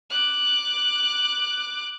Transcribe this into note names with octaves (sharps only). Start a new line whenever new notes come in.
D6 F#6